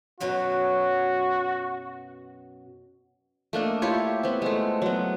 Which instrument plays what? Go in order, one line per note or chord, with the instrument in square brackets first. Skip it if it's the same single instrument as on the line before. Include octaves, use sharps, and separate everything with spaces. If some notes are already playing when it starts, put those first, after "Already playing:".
[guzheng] F#2 B2 F#3 [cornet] F#4
[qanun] A3 A#3 D4 D#5
E4 F4 G4 C#5
B3 C4
G#3 A3
F#3 B3